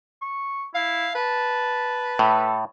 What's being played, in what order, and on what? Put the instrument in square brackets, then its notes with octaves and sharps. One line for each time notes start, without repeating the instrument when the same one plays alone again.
[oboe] C#6
[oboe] E4 [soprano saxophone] F5
[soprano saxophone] B4 [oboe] A5
[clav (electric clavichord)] A2 [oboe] A4